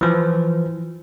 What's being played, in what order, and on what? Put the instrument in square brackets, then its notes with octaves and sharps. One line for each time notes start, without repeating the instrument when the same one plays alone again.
[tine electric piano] E3 F3